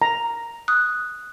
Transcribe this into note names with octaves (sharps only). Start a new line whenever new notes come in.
A#5
D#6 F#6